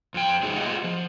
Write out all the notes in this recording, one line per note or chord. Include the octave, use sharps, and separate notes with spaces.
F2 G5
F#3 G#3 D#4 G#4 E5
F4 G4 G#4 D#5 E5 F#5
F3